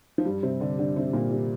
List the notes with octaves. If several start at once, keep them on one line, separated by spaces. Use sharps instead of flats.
F3
G2 G3
C3 C4
D3 D4
D3 D4
C3 C4
A#2 A#3
G3